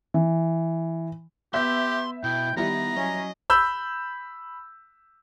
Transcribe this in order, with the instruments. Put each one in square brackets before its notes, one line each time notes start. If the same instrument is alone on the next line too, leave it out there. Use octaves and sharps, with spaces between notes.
[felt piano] E3
[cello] B3 [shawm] G4 [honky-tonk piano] E5 G6 [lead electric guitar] C6
[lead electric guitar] B2 [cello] E4 [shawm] G5
[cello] D#3 [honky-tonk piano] G3 E4 [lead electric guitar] B3 [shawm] A#5
[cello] F#3 C#4 [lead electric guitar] D#5
[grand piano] B5 E6 G6